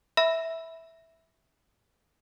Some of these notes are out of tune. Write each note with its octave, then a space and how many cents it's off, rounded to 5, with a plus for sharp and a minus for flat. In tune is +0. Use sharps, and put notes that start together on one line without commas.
E5 -10 B5 +0 E6 +5